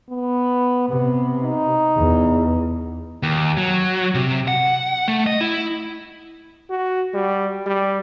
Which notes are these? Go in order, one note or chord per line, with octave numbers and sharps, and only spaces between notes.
B3
C3 B3
D#4
E2
D#2
F#3
C3
F#5
A3
D#5
E4
F#4
G3
G3